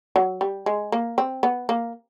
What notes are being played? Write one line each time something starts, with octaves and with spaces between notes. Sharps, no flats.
F#3
G3
G#3
A#3
C4
B3
A#3